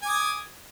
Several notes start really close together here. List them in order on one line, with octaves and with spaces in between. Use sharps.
G#5 D6 D#6